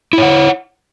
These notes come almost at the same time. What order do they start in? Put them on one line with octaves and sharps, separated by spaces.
E4 C#5 F#5